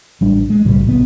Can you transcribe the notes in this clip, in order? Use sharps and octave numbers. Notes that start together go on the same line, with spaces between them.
A1 G3 D4
G#3
B1 A2 C#3 G3
A1 C3 A3 B3